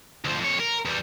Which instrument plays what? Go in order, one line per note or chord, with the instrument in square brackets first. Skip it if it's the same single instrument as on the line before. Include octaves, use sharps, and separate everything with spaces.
[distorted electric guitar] D2 F3
F2 C#5
A#4
E2 G3